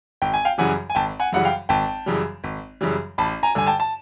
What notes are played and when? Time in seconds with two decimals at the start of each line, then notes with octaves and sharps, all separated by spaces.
0.22 G#1 G5
0.33 G#5
0.45 F5 G5
0.58 F#2 C#3 E3 G3 F#5 G#5
0.90 G#5
0.95 G#1 G5 A5
1.20 F#5 G#5
1.32 F#2 C#3 E3 G3 F#5
1.45 F5 G5
1.69 G#1 G5 A5
2.06 F#2 C#3 E3 G3
2.44 G#1
2.81 F#2 C#3 E3 G3
3.18 A1 A5 B5
3.43 G#5 A#5
3.55 G2 D3 G#5
3.67 G5 A5
3.80 A5